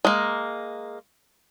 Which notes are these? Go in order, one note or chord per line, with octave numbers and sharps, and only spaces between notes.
G#3 A#3